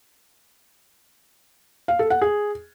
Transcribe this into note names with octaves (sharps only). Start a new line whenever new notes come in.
F5
A4
F#5
G#4